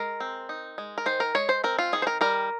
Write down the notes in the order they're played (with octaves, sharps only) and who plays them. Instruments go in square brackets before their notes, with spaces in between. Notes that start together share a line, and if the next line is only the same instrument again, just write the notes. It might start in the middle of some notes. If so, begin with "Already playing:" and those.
Already playing: [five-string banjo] G#3 A#4
C4
D#4
G#3
A#4
D#3 C5
A#4
G#3 C#5
C5
C4 A#4
F4
D#3 G#4
C5
A#4
G3 A#4